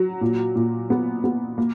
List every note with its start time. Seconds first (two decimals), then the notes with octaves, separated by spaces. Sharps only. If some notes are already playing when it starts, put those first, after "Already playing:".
Already playing: F#3
0.21 A#2
0.56 A#2
0.90 B3
1.24 B3
1.58 A#3